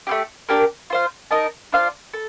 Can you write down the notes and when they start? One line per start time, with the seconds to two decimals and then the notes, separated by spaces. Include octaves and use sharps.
0.07 A3 C4 G4
0.49 A#3 D4 G4 A#4
0.90 F4 C5 F5
1.31 D#4 A#4 D#5 A5
1.72 D4 F4 C5 F5
2.13 A4